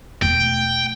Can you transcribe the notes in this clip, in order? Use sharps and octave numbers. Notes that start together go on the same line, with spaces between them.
E1 A3 G5